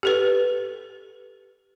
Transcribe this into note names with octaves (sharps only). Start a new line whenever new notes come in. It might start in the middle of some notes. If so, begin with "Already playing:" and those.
G4 A4 B4